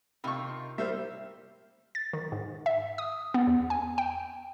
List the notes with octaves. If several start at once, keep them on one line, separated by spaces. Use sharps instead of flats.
C3 D#3 F4 B5 C#6
G3 A#4 C5 E5
A6
D#3
G#2
E5
D#6
B3
E2
G#5
G5